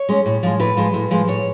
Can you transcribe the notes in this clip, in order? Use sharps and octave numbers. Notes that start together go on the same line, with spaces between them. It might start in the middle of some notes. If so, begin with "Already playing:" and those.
Already playing: C#5
G#3 C#4
A2
F3 G#3
A2 B4
F3 G#3
A2
F3 G#3
A2 C#5